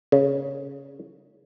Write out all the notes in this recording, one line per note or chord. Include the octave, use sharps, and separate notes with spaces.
C#3